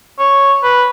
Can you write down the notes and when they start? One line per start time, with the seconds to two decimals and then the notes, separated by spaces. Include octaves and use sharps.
0.19 C#5
0.63 B4